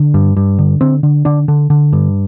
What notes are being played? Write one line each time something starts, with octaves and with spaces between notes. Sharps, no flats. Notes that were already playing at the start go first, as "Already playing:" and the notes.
Already playing: D3
G2
G2
D3
D3 C4
D3
D3 D4
D3
D3
G2